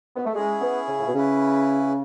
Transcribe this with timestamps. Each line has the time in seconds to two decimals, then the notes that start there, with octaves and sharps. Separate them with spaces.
0.16 B3
0.26 A3
0.35 G#3 C#4 E4 G#4
0.62 B3
0.87 C#3
1.00 A2
1.07 B2
1.14 C#3 C#4 E4 B4